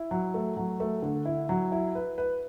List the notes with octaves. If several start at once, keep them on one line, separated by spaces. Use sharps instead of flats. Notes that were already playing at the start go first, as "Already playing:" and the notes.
Already playing: E4
F#3
A3
F#3
A3
D3
E4
F#3
E4
B4
B4